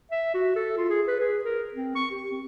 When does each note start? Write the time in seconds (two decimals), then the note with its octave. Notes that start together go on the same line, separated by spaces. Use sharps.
0.11 E5
0.34 F#4
0.56 A4
0.77 F4
0.90 G#4
1.08 B4
1.20 G#4
1.45 A#4
1.74 C4
1.95 C#6
2.11 G4
2.31 C4